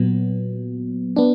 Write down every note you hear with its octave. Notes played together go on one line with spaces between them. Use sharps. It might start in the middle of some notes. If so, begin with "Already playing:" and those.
Already playing: A#2 F#3 B3
B3 D4